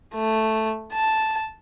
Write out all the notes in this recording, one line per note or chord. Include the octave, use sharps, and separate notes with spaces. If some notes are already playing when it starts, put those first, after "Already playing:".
A3
A5